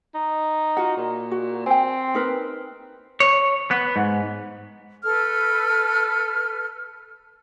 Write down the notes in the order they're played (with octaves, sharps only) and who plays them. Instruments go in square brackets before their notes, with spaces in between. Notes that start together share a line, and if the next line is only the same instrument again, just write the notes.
[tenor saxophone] D#4
[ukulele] F4 F#4 F#5
[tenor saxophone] A#2
[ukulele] F#4
[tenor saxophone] C4 [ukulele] G5 G#5
[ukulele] D#4 A#4 B4
[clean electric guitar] C#5
B3
G#2
[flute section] A4 B4 F6